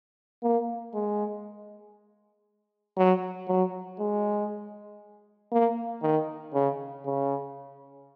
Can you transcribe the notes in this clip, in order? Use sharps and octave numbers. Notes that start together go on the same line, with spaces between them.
A#3
G#3
F#3
F#3
G#3
A#3
D#3
C#3
C#3